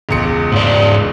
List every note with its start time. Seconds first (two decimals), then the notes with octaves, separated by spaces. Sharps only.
0.09 E1 C#2 C#7
0.52 G#2 D5